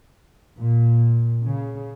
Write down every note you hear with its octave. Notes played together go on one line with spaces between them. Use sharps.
A#2
C#3